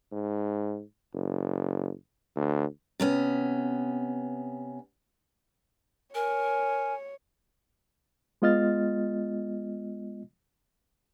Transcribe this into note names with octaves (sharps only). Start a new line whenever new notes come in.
G#2
F#1
D2
C3 B3 C#4
A#4 C#5 G#5
G#3 B3 F4 D#5 F6 A6